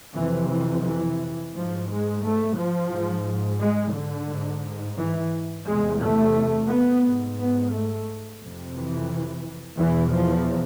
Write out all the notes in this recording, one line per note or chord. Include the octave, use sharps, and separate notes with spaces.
F2 C3 E3
E3
E3
G#2 F3
G#3
A3
F3
G#2
G#3
D3
G#2
E3
E2 C3 G#3
A3
B3
G#2
B3
A3
F2 C3
E3
E2 B2 E3
F3